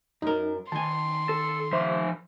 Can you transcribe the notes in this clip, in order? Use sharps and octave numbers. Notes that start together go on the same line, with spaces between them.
F#2 D#4 A#4
D#3 G#5 A5 C6
A4
F3 C5 E5